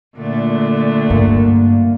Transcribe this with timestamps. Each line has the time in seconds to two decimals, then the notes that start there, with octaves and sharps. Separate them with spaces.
0.18 A#2 D3 A3
1.10 G2 A#3